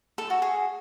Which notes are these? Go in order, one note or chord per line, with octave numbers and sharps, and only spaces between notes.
A4
F#4
G#4